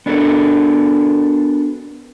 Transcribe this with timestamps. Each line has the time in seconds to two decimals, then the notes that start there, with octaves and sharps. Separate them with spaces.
0.06 B3 D4 F#4 A4 A#4